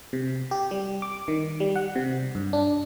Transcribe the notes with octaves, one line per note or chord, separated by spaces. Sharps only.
C3
G4
G3
D6
D#3
G3
F#5
C3
G2
D4